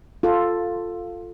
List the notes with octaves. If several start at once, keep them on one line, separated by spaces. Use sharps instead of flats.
F4 A4